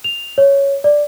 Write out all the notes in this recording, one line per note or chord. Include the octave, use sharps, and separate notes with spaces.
F7
C#5
D5